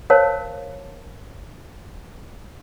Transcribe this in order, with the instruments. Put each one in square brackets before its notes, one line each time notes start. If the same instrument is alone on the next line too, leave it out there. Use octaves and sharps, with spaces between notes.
[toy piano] A#4 C5 C#5 F5 A5